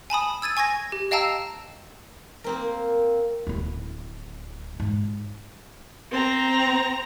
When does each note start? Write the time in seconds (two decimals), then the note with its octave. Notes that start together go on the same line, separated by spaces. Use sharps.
0.10 G#5 A5 B5 D#6
0.42 E6 G#6 A6 D#7
0.57 G#5 C#6 G#6 A#6
0.92 G4
1.11 D#5 F5 G5 A5 A#5 E6
2.44 A#3 C4 A#4
3.47 D1 E4
4.80 G#2
6.11 C4 A#5